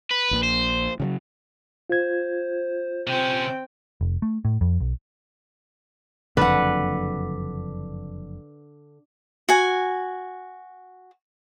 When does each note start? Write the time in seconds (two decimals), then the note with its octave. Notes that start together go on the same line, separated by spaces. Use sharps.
0.11 B4
0.31 A#1 A#2
0.43 C5
1.00 C#3 F3 F#3
1.90 F4 C5 G#6
3.07 C3 C4 C#4 G5
4.01 F1
4.22 A3
4.45 A2
4.61 F2
4.80 B1
6.37 F#1 F2 D3 B4 F#5
9.49 F#4 G#5